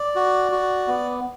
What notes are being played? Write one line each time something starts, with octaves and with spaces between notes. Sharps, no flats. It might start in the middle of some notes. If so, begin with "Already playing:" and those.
Already playing: D5
F#4
F#4
B3